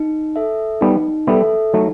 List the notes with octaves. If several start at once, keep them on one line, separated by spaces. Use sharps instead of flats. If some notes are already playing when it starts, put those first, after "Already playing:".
Already playing: D#4
A4 E5
G3 B3 D#4
G3 B3 A4 E5
F#3 A3 D#4